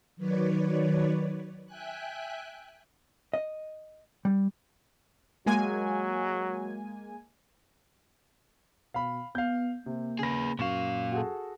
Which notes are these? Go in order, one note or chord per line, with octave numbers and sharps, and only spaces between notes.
D#3 F#3 B4 C#5 D5
E5 G5 G#5 F#6
D#5
G3
F#3 G#3 A#3 G#5
B2 F5 B5
B3 F5 G6
C3 A#3
C#3 G#4 B4 A#6
F#2 A#2 F5 C#6 E7
F#4 G#4 A4